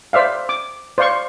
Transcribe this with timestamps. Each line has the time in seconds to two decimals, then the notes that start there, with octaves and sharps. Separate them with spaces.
0.13 C5 D5 E5 F5
0.49 D6
0.98 C5 D5 F5 C6 C#6